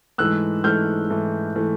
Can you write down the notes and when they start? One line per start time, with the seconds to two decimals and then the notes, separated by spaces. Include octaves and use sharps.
0.18 G#2 E3 A3 E6 F#6
0.64 G#2 E3 A3 F6 G6
1.10 G#2 E3 A3
1.56 E3 A3